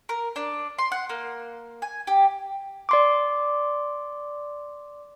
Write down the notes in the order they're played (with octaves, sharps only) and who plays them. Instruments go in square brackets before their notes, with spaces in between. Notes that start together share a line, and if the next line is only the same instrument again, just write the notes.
[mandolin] A#4
D4
C6
F#5
A#3
G#5
G4
[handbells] D5 C6 D6